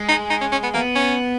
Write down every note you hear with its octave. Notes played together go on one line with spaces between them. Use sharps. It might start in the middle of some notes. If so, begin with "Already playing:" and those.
Already playing: G#3
D#4
D#4
C#4
C#4
B3
A#3 B3
C#4